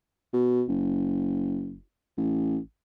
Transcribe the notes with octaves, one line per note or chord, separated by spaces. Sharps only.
B2
F#1
A1